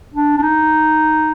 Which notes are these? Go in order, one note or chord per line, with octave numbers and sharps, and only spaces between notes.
D4
D4
D#4